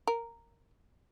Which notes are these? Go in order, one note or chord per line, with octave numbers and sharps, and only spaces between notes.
A#4